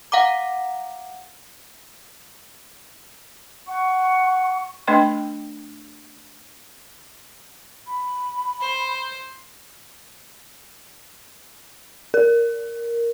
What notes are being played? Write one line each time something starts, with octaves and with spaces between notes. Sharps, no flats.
F5 F#5 A#5 D6
F#5 C#6
A3 D4 B4 D#5 G5 C6
B5
C5
A#4